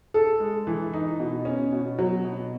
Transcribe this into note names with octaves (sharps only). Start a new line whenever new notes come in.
A4
G#3
E3
D#4
B2
C#4
B2
F#3
B2